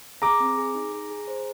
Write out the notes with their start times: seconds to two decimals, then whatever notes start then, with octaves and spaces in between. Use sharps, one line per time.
0.22 G#4 A#5 D6
0.40 C4
0.58 G#4
0.75 D#4
0.92 G#4
1.10 G#4
1.28 C5